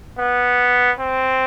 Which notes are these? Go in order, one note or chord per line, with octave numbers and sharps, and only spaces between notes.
B3
C4